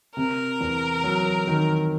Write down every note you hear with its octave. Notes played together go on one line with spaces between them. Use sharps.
C3 A#4
E2
F#3
D#3